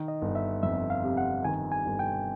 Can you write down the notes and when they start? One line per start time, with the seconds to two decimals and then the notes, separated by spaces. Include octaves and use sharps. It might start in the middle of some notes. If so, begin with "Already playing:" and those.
Already playing: D#3
0.08 D#5
0.22 G1
0.35 E5
0.63 F2 E5
0.90 F5
1.04 C3
1.17 F#5
1.44 D#3 G#5
1.72 G#5
1.86 G1
1.99 G5